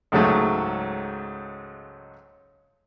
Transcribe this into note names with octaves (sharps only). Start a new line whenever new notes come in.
C#2 G#2 C#3 F#3 A3 C#4